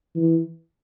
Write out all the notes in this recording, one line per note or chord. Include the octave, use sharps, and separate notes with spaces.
E3